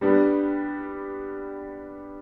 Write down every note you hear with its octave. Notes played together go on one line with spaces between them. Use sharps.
G3 B3 D4 G4